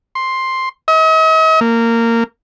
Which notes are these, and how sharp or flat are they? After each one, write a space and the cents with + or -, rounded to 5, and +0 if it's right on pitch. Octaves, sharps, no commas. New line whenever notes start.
C6 +5
D#5 +45
A#3 -15